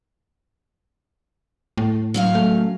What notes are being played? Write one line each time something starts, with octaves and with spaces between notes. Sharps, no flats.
A2
F#3 C#4 F5
A3